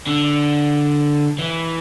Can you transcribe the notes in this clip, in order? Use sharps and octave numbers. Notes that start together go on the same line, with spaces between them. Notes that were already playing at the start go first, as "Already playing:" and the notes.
D3
E3